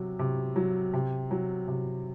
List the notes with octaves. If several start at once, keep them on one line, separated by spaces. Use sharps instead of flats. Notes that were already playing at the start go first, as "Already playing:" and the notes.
Already playing: C3 F#3
C3
F#3
C3
F#3
C3